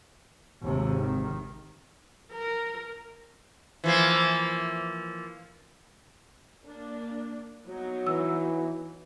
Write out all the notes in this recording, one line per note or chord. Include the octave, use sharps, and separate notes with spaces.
G#1 D#2 C3
D#3
A#4
E3 F3 A#3
A#3 D4
F#3 B3 D#4
E3 E6